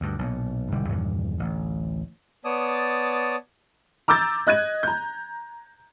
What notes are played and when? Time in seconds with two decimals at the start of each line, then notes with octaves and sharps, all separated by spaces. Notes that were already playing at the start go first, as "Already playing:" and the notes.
0.01 D2 G2
0.19 B1 A#2
0.71 B1 G#2 D3 G3
0.89 E2 G2 A#2 D#3
1.38 A1 D2
2.45 B3 C#5 D5 A5 D#6
4.08 A#5 D6 E6 G6 A6
4.47 D#5 F#6 G#6 D#7
4.83 A#5 G6